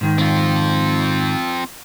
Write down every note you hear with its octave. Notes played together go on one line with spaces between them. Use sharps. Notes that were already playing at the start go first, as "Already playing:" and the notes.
G#2 D#3
C4 F4